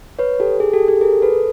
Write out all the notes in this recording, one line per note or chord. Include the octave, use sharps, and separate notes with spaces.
B4 C#5
G4 A4
G#4
G4 A4
G4 A4
G#4 A#4
A4 B4